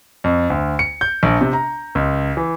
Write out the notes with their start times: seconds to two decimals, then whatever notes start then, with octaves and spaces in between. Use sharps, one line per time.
0.24 F2
0.50 D2
0.79 C#7
1.01 G6
1.23 A#1
1.41 C3
1.53 A#5
1.95 C#2
2.37 E3